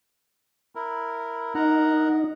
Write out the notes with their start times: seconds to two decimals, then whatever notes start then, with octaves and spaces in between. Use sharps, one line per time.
0.75 E4 A#4
1.55 D#4 A#4 F#5 A#5